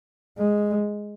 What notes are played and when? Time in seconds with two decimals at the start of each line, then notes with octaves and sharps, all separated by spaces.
0.38 G#3